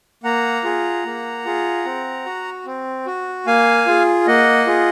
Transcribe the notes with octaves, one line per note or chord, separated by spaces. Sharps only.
A#3 F#5 A#5
F4 G#4
A#3
F4 G#4
C4
F#4
C4
F#4
A#3 F5 G#5
F4 G#4
A#3 D#5 F#5
F4 G#4